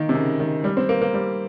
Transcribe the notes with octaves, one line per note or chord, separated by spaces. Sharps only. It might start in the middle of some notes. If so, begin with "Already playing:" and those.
Already playing: D#3 A#3
C3
C#3
D#3
G3
C4
A#3
A#3
G3